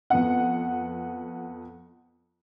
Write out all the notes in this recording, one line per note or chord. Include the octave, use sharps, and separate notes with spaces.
F2 B3 F#5